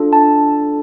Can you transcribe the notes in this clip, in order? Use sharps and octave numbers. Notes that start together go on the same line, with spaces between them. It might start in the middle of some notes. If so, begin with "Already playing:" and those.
Already playing: D4 F4 A4
A5